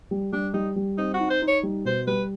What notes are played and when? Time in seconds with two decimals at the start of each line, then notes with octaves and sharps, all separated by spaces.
0.11 G3
0.33 G3 D4
0.54 G3 D#4
0.76 G3
0.98 C4 D#4
1.14 F#4
1.20 D#4
1.30 C5
1.42 D#4
1.48 C#5
1.63 G3
1.85 B2 C5
2.07 G3 B4